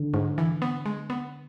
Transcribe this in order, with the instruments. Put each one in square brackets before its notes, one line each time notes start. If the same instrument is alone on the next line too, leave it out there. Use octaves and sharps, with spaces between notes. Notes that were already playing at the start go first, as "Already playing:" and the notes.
Already playing: [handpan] D3
[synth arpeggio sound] G#2
E3
B3
G#3
B3